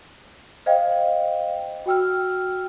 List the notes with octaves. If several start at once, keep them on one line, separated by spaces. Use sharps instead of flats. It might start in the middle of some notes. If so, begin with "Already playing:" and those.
C5 D#5 F5 G5
F#4 G5 E6 F6